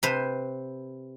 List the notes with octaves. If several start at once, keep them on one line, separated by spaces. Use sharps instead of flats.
C3 B4 C5